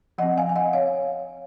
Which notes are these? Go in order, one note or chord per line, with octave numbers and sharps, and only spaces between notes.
F3 C4 D#5 F#5
F5 G#5
G#5
D#5 F#5
C#5 F5